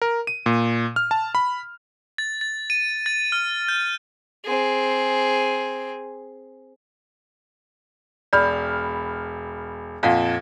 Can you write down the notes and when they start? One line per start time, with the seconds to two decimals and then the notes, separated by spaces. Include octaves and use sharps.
0.02 A#4
0.27 D#7
0.46 A#2
0.96 F6
1.11 A5
1.35 B5
2.18 A6
2.41 A6
2.70 D#7
3.06 A6
3.32 F6
3.68 G6
4.45 C4 G#4
8.33 E1 D5 B5 F6
10.03 F2 A#2 F5 F#5